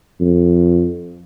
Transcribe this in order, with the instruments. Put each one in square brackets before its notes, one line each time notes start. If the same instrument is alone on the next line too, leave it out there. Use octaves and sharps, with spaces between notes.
[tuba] F2